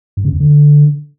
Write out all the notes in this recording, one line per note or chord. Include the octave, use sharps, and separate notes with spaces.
G2
C#3
E2
D3